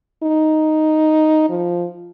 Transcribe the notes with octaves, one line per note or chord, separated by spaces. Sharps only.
D#4
F3